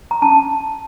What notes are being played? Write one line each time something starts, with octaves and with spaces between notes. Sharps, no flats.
A#5
C#4 A5